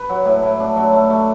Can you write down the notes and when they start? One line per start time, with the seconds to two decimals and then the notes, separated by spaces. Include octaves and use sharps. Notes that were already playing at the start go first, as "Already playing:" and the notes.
Already playing: B4
0.10 F#3
0.25 A2
0.43 A2
0.60 D4
0.77 F#3
0.93 A3
1.10 A3